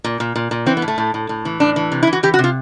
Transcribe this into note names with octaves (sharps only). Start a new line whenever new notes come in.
A#2
A#2
A#2
A#2
E3 C4
B3
A2
A3
A2
A2
A2
E3
A2 D4
E3
C3
E4
E3
F#4
E3 G4
F#4
C3
F4